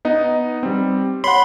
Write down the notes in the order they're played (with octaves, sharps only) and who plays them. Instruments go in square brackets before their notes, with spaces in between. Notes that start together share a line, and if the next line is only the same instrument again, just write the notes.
[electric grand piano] B3 D#4 D#5
G3 C4
[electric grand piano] C#5 F#5 [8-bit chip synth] B5 C6